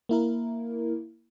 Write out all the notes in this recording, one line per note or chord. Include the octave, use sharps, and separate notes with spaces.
A#3 E4 A#4